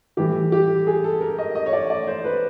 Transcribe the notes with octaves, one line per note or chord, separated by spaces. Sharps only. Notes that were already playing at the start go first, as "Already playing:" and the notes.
A2 E3 G3 G4
G4
G#4
A4
A#4
D#5
D#5
C#5
D5
D5
C5
B4